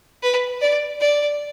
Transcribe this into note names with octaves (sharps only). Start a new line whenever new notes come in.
B4
D5
D5